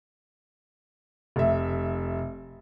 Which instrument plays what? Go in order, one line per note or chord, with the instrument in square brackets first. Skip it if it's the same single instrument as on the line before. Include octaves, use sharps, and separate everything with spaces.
[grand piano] F1 E5